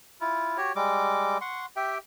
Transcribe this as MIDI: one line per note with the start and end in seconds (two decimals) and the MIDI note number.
0.21 0.57 64
0.21 0.57 65
0.57 0.72 66
0.57 0.72 67
0.57 0.72 73
0.76 1.38 55
0.76 1.38 56
0.76 1.38 86
1.41 1.66 78
1.41 1.66 84
1.41 1.66 85
1.76 1.98 67
1.76 1.98 76
1.76 1.98 79